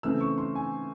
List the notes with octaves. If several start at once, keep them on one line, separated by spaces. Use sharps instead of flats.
C#3 E3 A3 C4 E6
C#6
C6
G#5